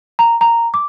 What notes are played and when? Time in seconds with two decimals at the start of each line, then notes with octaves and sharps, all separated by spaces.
0.19 A#5
0.41 A#5
0.74 D6